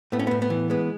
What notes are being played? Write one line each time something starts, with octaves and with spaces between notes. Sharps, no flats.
A2 B3
C#4
A2 B3
B3
E3
G#3 B3